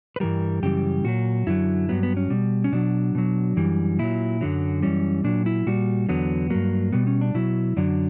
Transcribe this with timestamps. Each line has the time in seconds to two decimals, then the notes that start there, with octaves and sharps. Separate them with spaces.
0.16 B4
0.20 G2 E3 G3 A#4
0.63 F#2 C#3 E3 G3 G4
1.04 A#2 F#3 F#4
1.47 F#2 D3 F#3 E4
1.89 G2 F#3 B3
2.03 B3
2.17 C#4
2.30 B2 G3
2.64 C#4
2.72 B2 F#3 D4
3.15 B2 F#3
3.57 F#2 E3 G3
3.99 A#2 F#3 E4
4.41 F#2 D3 F#3
4.82 F#2 E3 G3 C#4
5.24 A#2 F#3 D4
5.46 E4
5.66 A#2 G3 F#4
6.09 E2 D3 F#3 B3
6.50 G2 F#3 A#3
6.92 B2 G3 B3
7.07 C#4
7.21 D4
7.34 B2 F#3 E4
7.77 F#2 D3 F#3 D4